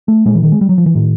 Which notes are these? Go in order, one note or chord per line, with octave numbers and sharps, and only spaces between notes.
A3
A#2 G#3
E3
D#3
G#3
G3
F#3
F3
E3
A2 D#3